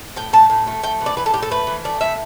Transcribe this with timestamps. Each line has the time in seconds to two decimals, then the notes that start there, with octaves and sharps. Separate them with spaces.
0.16 A2 G5
0.33 A2 A5
0.50 A2
0.67 A3
0.83 A3 G5
1.01 E3
1.06 D5
1.17 E3 B4
1.26 A4
1.33 A2 G4
1.42 A4
1.51 A3 B4
1.67 E3
1.84 A3 D5
2.01 A2 E5